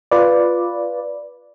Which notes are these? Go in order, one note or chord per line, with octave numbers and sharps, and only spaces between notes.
F4 B4 D5